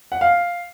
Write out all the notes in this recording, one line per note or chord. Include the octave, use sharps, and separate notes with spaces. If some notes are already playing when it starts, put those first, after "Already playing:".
F#5
F5